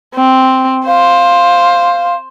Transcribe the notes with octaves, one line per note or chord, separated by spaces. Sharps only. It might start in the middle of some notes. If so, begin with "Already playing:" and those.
C4
C5 F5